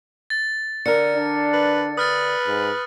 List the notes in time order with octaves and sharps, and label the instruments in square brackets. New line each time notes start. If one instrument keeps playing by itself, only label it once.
[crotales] A6
[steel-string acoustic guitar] D3 A#4 [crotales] C#7
[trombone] D4
[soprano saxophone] B4
[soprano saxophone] B4 [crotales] D#6 F6 A6
[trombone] G#2